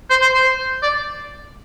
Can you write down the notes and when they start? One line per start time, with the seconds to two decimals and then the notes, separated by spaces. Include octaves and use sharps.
0.10 C5
0.22 C5
0.34 C5
0.83 D5